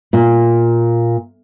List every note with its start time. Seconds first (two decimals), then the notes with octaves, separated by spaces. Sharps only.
0.13 A#2